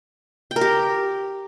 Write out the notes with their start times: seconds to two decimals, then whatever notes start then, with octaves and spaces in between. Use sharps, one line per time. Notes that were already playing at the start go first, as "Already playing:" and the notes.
0.51 G5
0.56 A#4
0.61 G4